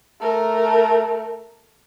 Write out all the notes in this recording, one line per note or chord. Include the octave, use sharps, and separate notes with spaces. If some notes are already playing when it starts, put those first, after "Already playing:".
A3 A#4